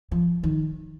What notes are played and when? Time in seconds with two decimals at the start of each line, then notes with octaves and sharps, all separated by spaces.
0.12 F3
0.44 D#3